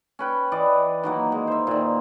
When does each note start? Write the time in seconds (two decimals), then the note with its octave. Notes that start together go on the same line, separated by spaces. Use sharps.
0.19 C#4 B4 G5
0.52 E3 D5 D#5
1.03 D#3 F#3 A#3
1.32 G#3
1.47 C5 E5
1.67 A#2 D#3